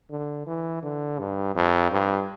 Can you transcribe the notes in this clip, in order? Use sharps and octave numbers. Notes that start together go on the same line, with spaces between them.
D3
E3
D3
G2
F2
G2